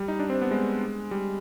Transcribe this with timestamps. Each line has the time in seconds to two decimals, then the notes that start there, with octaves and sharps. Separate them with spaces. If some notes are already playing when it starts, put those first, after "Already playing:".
Already playing: G3
0.08 D#4
0.19 D4
0.30 C4
0.42 B3
0.51 G#3
1.11 G3